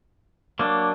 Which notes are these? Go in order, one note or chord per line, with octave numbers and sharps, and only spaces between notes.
F#3 A#3 D4